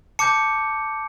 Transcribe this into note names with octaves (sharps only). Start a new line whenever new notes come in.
A5 D6 G6 C#7